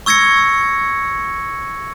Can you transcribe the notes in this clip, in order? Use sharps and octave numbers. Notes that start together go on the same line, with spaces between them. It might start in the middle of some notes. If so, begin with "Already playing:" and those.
C#6 E6 G#6 A#6 C#7